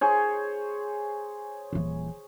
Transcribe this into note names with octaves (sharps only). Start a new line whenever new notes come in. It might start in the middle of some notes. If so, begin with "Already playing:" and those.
G#4 C5 C#5
D#1 E3